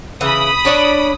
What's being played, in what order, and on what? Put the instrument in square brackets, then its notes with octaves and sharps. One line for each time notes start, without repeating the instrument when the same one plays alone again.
[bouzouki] C#3 E3 [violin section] B5 D#6
[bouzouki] D4 C#5 D5